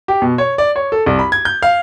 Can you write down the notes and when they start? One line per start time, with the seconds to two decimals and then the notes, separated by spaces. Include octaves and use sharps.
0.08 G4
0.22 B2
0.38 C#5
0.58 D5
0.76 C#5
0.92 A4
1.06 C2
1.19 B5
1.32 G#6
1.45 G6
1.62 F5